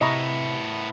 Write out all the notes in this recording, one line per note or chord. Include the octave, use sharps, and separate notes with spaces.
A2 C3 B3 E4 D#5 A#5 C#6